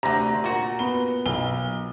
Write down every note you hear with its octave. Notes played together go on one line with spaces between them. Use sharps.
D2 C3 A#5 A#6
A#2 F#4
B3 G7
B1 G7